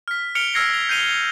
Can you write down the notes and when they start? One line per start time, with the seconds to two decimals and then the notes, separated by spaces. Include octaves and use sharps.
0.08 F6 B6
0.35 F6 C#7 D7 F7 G7
0.54 E6 F6 G#6 A#6 C7 C#7
0.74 F7
0.89 G6 C7 D#7 F7 G7
1.04 F7